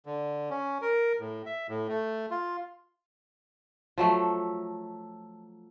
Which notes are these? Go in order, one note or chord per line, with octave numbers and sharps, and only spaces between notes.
D3
C#4
A#4
A2
E5
A2
A3
F4
F3 F#3 A3